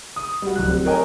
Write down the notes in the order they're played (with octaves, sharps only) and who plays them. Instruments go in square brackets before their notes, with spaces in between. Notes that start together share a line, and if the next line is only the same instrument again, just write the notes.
[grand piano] D#6
G3 F#4
D1 F#6
C4 G4
A#4 C#5 D#5 G5 G#5 A#5